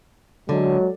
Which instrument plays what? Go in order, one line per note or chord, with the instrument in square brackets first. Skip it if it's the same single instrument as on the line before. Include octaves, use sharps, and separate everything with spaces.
[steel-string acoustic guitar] D3 [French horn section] F#3 G#3